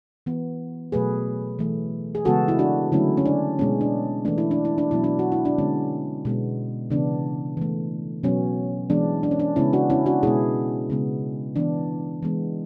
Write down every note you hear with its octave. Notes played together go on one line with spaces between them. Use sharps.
E3 B3
B2 F#3 A3 G#4 B4
E3 A3
G#4
C#3 E3 G#3 B3 F#4 A4
E4
D4 F#4
D3 F#3 A3 C#4 E4
C#4
D4
B2 G#3 B3 C#4
D4
E3 A3 D4
E4
D4
E4
D4
B2 F#3 B3 E4
D4
F#4
E4
D4
D3 G#3 B3 C#4
B2 G#3 B3
C#3 E3 B3 D4
E3 A3
B2 F#3 B3 C#4
E3 G#3 B3 D4
D4
C#4
D4
C#3 G#3 B3 C#4 E4
D4 F#4
C#4 E4
D4 F#4
B2 G#3 B3 E4 G#4
C#3 G#3 B3
E3 B3 D4
E3 G#3 B3